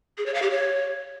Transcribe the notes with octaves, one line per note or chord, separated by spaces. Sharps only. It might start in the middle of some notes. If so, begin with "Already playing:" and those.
G#4
C#5
F5
G4
C#5